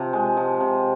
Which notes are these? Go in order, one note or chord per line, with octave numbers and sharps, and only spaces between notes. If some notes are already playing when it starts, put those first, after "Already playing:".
Already playing: C3 F3
G#3
F3
C3